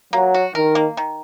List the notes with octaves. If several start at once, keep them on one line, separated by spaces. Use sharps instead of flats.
F#3 A#3
F#4
D#3 A#4
A#3
D#3